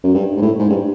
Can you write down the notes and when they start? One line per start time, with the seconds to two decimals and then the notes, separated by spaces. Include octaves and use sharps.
0.04 F#2
0.15 G2
0.36 G#2
0.42 A2
0.59 G#2
0.70 G2